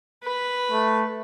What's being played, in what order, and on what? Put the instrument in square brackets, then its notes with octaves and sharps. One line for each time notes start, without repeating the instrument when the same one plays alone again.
[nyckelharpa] B4 B5
[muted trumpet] A3